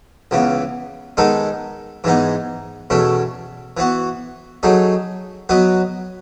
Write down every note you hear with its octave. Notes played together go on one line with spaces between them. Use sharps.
C#2 C#3 E3 B3
D#3 G#3 B3 D#4 A4
G#2 E3 G#3 B3 D#4
E2 B2 A3 C#4 E4
E3 B3 F#4
F#3 A3 D#4 G#4
F#3 B3 F#4 B4 D#5